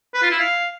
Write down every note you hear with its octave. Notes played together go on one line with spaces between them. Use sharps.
B4
F4
E4
F5